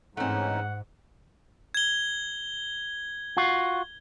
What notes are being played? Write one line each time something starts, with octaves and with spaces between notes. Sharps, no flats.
G#2 E3 A3 C4 C#4 D#4 F#5
G#6 G7
F4 F#4